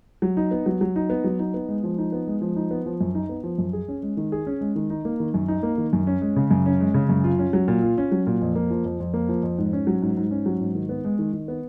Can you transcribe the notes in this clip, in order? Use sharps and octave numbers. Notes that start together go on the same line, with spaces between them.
F#3
D#4
B3
F#3
F#3
D#4
B3
F#3
D#4
B3
G#3
F3
D#4
B3
G#3
F3
D#4
B3
F3
F#2
D#4
B3
F3
F#2
G#4
C#4
G#3
D#3
G#4
C#4
G#3
D#3
D#4
A#3
D#3
F#2
D#4
A#3
D#3
F#2
C#4
G#3
C#3
F#2
C#4
G#3
C#3
F#2
F4
C#4
F#3
A#2
F4
C#4
F#3
A#2
F2
A#3
F3
F2
F2
A#3
F3
F2
G#2
C#4
F#3
G#2
G#2
C#4
F#3
G#2
D#3
B3
G#3
D#3
D#3
B3